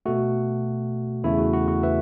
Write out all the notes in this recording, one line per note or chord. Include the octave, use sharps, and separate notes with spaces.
B2 A3 F#4
E2 C#3 A3 E4 A4
F#4
F#4
F#4
B4 E5